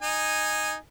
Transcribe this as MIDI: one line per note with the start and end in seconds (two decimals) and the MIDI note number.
0.02 0.75 63
0.02 0.75 80